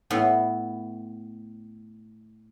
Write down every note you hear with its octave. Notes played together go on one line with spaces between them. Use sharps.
A2 B3